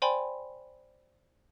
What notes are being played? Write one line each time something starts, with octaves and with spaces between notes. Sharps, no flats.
C5 D5 G5 G#5 B5 C6